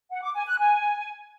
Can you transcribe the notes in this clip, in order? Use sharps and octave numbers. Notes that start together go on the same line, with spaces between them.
F#5
D6
G#5
F#6
G#5